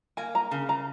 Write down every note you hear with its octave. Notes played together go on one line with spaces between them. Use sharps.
A#3 G#5
A#5
C#3
A#5